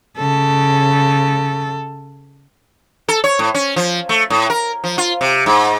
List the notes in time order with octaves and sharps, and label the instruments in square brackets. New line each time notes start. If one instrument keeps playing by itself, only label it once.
[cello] C#3 A4
[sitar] A4
C#5
A2
C#4
F3
A3
A2
A#4
F3
F4
C3
G#2